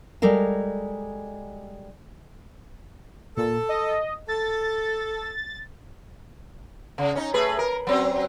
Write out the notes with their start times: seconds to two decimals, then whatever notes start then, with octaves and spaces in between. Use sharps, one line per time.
0.22 G3 G#3 A4 A#4 F5
3.37 A#2 A4
3.69 D#5
4.28 A4 A6
6.98 C#3
7.15 C#4 D#4
7.34 A3 G#4 B4
7.59 A#4
7.87 F#3 C4 C#4